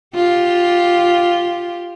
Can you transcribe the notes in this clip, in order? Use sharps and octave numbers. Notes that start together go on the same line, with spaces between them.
F4 G4